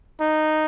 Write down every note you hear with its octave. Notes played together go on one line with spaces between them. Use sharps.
D#4